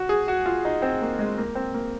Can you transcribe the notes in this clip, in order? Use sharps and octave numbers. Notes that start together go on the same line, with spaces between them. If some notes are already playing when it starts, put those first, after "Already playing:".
Already playing: F#4
G#4
F#4
F4
D#4
C4
A#3
G#3
A#3
C4
A#3